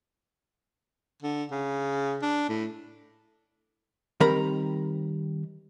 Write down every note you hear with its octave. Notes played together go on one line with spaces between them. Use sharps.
D3
C#3
D4
A2
D#3 G3 C4 A#4 A#5 B5